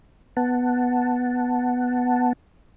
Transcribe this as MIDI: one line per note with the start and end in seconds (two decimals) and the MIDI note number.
0.37 2.33 59
0.37 2.33 78
0.37 2.33 81